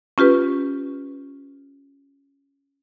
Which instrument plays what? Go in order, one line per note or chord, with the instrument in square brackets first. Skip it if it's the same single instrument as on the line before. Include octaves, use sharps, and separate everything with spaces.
[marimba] C#4 F4 G4 B4